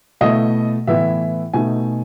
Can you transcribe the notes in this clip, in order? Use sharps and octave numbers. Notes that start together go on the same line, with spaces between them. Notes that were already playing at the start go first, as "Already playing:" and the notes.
B2 A3 E4 D#5
A2 E3 B3 E4 E5
B2 A3 D#4 G#5